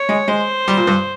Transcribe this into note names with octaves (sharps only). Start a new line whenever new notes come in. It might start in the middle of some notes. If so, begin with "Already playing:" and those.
Already playing: C#5
G#3
G#3 C5
G3
A#2
G2